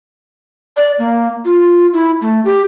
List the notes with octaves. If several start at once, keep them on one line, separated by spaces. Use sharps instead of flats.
D5
A#3
F4
E4
A3
G4